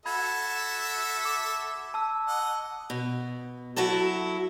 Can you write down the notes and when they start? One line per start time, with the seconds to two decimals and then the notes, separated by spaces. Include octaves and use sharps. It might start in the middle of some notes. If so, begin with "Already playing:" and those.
0.06 F#4 A4 E5 B5 G#6
1.25 D6
1.94 A5 E6
2.28 D#5 F#5
2.90 B2
3.76 F#3 E4 F#4 A4